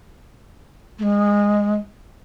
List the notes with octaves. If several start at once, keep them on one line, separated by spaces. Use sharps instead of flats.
A3
G#3